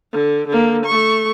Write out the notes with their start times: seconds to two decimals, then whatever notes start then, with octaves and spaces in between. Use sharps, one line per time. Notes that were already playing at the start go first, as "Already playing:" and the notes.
0.12 D3
0.48 D3 A#3
0.86 A3 C#6